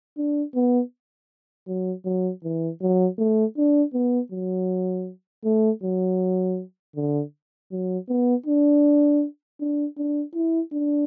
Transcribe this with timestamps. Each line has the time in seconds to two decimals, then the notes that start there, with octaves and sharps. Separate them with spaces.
0.17 D4
0.55 B3
1.67 F#3
2.05 F#3
2.44 E3
2.82 F#3
3.19 A3
3.57 D4
3.94 B3
4.32 F#3
5.44 A3
5.83 F#3
6.96 D3
7.72 F#3
8.09 B3
8.46 D4
9.60 D4
9.97 D4
10.35 E4
10.73 D4